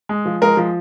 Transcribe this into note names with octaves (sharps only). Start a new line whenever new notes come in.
G#3
F3
G#3 A#4
F3